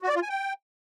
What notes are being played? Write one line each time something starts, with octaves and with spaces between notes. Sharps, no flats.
F#4
D5
F4
G#5
G5